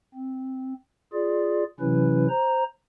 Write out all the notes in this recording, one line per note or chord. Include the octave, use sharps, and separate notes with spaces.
C4
F4 G#4 D5
C3 E3 F#3 C#4 E4 B4
C5 A#5